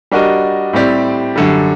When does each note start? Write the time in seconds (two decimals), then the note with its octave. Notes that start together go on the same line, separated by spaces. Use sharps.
0.11 G3 D4 F#4 A#4 D#5
0.73 A2 G3 C4 G4 D5
1.36 F#2 D3 G3